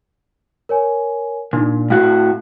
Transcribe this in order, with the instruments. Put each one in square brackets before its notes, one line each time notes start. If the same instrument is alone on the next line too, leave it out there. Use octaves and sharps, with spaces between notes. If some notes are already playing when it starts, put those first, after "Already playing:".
[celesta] A#4 C#5 G#5
[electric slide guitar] A#2 [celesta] D4 D#4
[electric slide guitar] A2 F#4 [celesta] F5